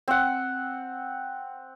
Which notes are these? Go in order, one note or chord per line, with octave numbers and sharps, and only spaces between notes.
C4 F#5